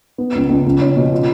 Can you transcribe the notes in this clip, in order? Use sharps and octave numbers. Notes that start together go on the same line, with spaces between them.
B3
C#2
C#2
C#2
C#4
B2
F4